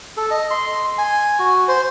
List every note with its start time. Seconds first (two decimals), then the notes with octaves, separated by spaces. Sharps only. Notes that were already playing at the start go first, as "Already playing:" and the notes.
0.17 A4
0.31 D#5
0.51 C6
0.98 G#5
1.39 F#4
1.68 C5